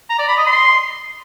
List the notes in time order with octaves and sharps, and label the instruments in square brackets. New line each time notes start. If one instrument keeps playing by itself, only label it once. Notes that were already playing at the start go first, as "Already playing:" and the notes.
[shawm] A#5
D5
B5
D#5
C6